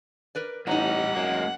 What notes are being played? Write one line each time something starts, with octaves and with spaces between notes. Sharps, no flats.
A#4 B4 D5
A1 A2 G3 D#4 D#5 F#5 A#5
F#2 G#3 A#3